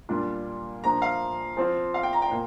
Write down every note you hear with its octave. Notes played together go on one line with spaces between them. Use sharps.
A#2 G3 D4 F4
A#2 F3 D4 A#5
F5
F3 C4 F4
F5
G5
A#5
G5
A#2